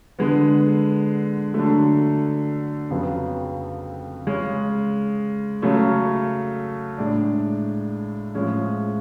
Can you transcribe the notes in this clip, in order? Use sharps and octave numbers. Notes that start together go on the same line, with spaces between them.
D3 G#3 B3
D3 F#3 A3
F2 C#3 F#3 B3
C#3 G#3 C#4
C#3 F#3 A3 C#4
A2 G#3 D4
A2 F3 G#3 C#4